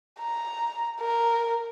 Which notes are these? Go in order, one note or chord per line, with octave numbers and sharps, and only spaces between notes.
A#5
A#4